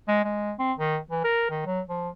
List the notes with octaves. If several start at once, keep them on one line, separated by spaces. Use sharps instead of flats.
G#3
G#3
C4
D#3
E3
A#4
D#3
F#3
F3